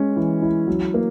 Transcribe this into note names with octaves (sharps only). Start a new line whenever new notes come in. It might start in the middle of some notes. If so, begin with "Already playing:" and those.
Already playing: G#3 C#4
E3
E4
F#3
A#3